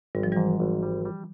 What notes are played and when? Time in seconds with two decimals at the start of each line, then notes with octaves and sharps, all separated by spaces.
0.15 G#1 G3
0.23 F3
0.32 G#2 E3 G3
0.60 G#1
0.83 G3
1.05 G3